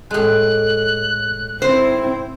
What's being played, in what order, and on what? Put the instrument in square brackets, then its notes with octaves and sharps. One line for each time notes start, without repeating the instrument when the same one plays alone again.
[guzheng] A2 G#3 [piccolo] F#6
[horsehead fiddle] C4 E4 [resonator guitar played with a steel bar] C5